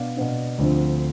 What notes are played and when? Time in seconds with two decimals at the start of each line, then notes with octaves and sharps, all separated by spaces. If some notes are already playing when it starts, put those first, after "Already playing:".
Already playing: B2 B3 D4 D5 F5
0.16 B2 B3 D4
0.58 D2 D3 F3 C4